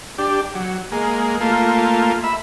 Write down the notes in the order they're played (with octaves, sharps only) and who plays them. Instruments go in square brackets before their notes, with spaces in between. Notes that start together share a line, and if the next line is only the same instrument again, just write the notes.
[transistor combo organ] D4 G4
F#3
G#3 A#3
A3 A#3 F4
E5 B5